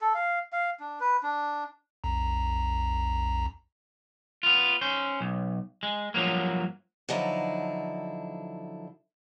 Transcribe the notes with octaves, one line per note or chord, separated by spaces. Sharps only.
A4
F5
F5
D4
B4
D4
B1 F2 A#5
B3 F4
C#4 C5
B1
G#3
G2 F3 F#3 A#3
D3 F3 F#3 D#4 E4